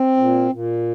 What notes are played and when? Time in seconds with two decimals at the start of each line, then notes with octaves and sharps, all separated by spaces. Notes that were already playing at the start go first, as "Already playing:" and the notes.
Already playing: C4
0.17 A#2
0.52 A#2